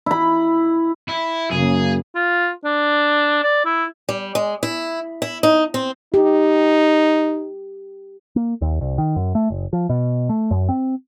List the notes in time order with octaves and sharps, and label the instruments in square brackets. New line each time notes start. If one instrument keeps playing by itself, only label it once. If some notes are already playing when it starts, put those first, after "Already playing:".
[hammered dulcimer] E4 B5
[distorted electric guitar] E4
[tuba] F#2 [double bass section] C#3 A#3 [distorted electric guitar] G#4
[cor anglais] F4
D4
D5
E4
[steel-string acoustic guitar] G3
G#3
E4
E4
D#4
C4
[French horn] D#4 [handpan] G4
[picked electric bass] A#3
D#2
C2
D#3
F#2
A3
F#1
F3
B2
A3
F#2
C4